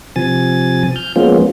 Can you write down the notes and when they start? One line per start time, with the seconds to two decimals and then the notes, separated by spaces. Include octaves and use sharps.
0.16 C3 F3 G#5 A6
0.96 F6 G6
1.16 F3 G#3 A#3 B3 C#4 F4